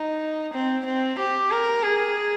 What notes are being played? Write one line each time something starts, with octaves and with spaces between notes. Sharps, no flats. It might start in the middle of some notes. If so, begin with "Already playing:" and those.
Already playing: D#4
C4
C4
G4
A#4
G#4